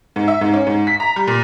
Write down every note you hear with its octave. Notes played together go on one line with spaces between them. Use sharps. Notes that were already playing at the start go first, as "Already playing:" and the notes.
G#2
E5
G#2
C#4
G#2
B6
A#5
G3
A#2